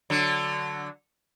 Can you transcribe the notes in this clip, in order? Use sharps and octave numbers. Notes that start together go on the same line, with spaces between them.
D3 F#3